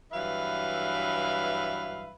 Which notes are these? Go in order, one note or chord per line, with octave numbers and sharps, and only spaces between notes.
G2 E3 F#3 B4 E5 F5